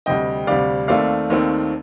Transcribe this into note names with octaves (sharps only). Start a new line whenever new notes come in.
D2 C3 G3 D#5 G5
D2 C3 G3 D5 F5
D#2 D#3 A3 C4 D5 F5
D#2 D#3 A3 C4